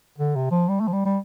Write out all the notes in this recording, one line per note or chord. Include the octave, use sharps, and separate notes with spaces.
D3
C3
F3
G3
A3
F3
G3
G3